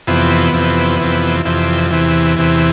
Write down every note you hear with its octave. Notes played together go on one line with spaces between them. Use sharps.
F2 C3 E3 B3
F2 C3 E3
F2 C3 E3
F2 C3 E3
E2 C3 E3
E2 C3 E3